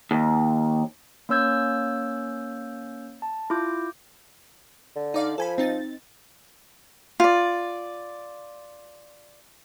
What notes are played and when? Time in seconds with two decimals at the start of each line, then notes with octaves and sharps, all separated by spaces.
0.11 D#2
1.29 A#3 C#4 C#5 E6 G6 G#6
3.22 A5
3.50 E4 F4 D6 G6
4.96 D3
5.14 D#4 D5 F5
5.38 F3 A4 G#5 B5
5.58 C4 D#4 A6
7.20 F4 D5